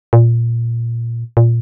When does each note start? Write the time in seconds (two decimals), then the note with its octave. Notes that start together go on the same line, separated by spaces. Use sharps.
0.13 A#2
1.37 A#2